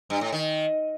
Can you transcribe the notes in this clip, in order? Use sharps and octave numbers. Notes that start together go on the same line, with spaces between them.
G2
A2
D#3